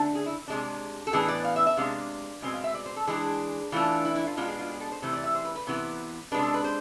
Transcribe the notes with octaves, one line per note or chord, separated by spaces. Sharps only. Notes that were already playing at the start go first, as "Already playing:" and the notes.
Already playing: D3 A3 D4
G#4
E4
C3 G#3 D4
A4
A2 E3 B3 D4 G#4
D5
F5
E5
E5
C3 G#3 D4 F5
B2 G#3 C4 G#5
F5
E5
D5
C5
A4
E3 G#3 D4 G#4
E3 A3 D4 F4
E4
E4
F4
B2 G#3 B3 D4 F4
G#4
F4
G#4
A4
C5
C3 E3 A3 C5
D5
E5
C5
B4
B4
C3 E3 B3
C3 G#3 D4 B4
A4
B4
C5